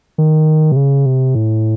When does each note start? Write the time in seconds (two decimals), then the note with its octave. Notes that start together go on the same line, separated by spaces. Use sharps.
0.18 D#3
0.72 C3
0.76 C#3
1.06 C3
1.35 A2